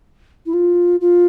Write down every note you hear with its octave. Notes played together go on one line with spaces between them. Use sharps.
E4
F4
F4